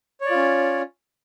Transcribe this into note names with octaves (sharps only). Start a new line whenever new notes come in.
C#4 F4 C#5 D5